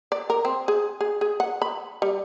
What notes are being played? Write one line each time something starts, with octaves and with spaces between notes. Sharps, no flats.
D5
A#4
C4
G#4
G#4
G#4
F#5
B5
G3